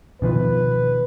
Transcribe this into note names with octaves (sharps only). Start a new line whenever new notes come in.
B2 D#3 F3 B4